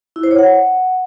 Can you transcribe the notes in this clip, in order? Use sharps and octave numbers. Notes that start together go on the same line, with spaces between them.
E4
C5
C#5
F#5